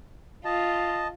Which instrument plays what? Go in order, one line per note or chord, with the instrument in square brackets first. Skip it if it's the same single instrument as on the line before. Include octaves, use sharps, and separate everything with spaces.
[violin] F4 [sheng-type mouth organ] D#5 A5